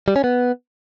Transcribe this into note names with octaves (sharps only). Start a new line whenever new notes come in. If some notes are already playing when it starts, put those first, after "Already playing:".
G3
C#4
B3